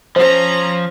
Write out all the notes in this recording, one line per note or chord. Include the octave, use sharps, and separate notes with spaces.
F3 C#4 C5 A#5